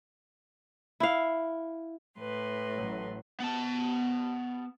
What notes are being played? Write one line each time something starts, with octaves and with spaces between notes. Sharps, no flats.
E4 F5
A2 B4 C6
A1 F#3
B3 A5